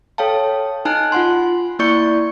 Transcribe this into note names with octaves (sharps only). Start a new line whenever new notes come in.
A4 C#5 F5 G5 A5
D#4 G#5 A5 F#6
F4 F#5 C6
A#3 E4 D5 C#6 G6 C#7